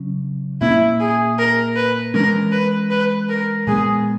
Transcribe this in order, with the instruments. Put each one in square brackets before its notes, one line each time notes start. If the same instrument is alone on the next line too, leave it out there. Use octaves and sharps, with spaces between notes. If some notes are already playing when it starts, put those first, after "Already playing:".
Already playing: [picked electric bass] C#3 F#3 C#4
[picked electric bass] A#2 A#3 C#4 [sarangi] E4
[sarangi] G#4
A#4
B4
[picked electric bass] E3 G#3 C#4 [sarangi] A#4
[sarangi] B4
B4
A#4
[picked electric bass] A#2 G#3 B3 [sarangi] G#4